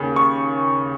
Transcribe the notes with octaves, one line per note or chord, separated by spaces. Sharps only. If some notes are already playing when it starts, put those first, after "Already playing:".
Already playing: D#2 C#3
C#6